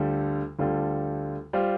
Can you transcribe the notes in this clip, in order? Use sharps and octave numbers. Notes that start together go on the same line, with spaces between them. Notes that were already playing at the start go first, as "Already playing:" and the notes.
Already playing: D2 D3 G3 F4 A4
D2 D3 G3 F4 A4
G3 F4 C5